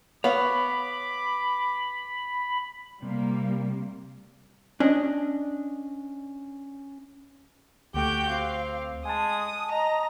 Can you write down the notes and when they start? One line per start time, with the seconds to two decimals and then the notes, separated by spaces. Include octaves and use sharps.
0.24 B3 C#5 F5 B5 D6
3.02 C3 G3 A#3
4.80 C#4 D4 D#5
7.94 D2 A3 F#4 G4 G5 D6 G6
8.30 C4 F5
9.05 G#3 G#5 A5 D#6
9.72 D#5 A#5